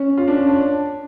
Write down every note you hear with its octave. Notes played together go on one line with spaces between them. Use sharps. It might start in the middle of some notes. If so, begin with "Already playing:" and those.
Already playing: C#4
F4
D4
C#4
D4